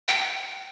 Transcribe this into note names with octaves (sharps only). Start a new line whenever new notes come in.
G5